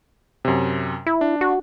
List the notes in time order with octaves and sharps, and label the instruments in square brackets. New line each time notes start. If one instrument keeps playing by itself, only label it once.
[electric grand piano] F#2 C3
[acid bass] E4
[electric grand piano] D4
[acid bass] F#4